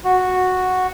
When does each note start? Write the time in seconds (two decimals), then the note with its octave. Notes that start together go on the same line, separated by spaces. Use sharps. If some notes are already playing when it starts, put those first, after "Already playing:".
0.05 F#4